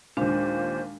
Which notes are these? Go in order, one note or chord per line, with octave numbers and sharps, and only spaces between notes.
D#2 A#2 G#3 D4 C5